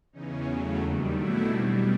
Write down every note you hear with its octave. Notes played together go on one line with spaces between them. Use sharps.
E2 C#3 E3 C#4 D#4
E2 C#3 F#3 A3
D#2 D#3 G3
B2 F#3 A3 D4 E4
B2 G3 C4 D4